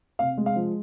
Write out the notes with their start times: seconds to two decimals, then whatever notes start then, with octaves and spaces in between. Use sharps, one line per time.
0.19 C3 F5
0.37 G#3
0.46 F5
0.56 F3